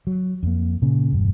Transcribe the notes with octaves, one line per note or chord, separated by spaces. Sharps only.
F#3
F2 A#3
A#2 C#3
E1 G2